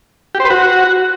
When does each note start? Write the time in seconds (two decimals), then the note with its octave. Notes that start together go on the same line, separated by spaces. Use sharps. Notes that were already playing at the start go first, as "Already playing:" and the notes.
0.35 G4
0.40 C5
0.45 B4
0.50 F#4